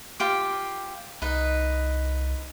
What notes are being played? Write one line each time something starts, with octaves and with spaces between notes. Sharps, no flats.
F4 G4 D6
C2 D#4 B4 D#5